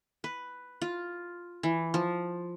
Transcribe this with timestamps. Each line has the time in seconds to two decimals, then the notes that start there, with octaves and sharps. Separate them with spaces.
0.24 B4
0.82 F4
1.63 E3
1.94 F3